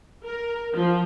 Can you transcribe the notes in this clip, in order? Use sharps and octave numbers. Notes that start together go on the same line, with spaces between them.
A#4
F3